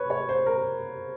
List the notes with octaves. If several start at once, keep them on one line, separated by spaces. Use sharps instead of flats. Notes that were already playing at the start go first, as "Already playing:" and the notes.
Already playing: B4 C#5
C#5
C5
A#4